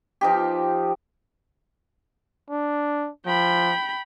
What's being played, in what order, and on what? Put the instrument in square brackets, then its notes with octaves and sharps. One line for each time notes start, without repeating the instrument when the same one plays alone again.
[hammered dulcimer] F3 D#4 G4
[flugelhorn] D4
[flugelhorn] F3 [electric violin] G5 B5